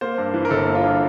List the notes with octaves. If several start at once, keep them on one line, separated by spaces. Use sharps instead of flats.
A#3 C5
G2
E3
A#4
G1 A4
A#3
F4
G2